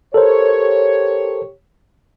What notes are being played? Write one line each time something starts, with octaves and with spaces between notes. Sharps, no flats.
G4 A4 A#4 C5 C#5